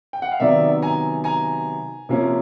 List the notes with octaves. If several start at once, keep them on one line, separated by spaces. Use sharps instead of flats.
G5
F#5
F5
C3 D#3 F#3 B3 D5 E5
G#5 A#5
G#5 A#5
C3 F3 A#3 C#4